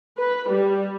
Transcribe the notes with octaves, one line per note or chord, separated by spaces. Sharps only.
B4
G3